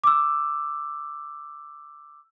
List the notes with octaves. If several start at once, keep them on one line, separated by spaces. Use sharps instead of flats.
D6 E6